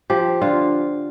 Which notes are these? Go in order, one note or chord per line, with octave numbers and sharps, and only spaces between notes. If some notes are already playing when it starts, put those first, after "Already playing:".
F3 G4
D3 F4